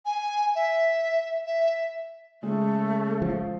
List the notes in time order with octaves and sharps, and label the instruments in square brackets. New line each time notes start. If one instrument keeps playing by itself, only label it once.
[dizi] G#5
E5
E5
[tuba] C#3 [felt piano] G#3 [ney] A3
[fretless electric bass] F3